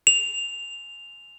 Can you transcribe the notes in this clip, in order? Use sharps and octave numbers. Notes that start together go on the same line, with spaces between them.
F7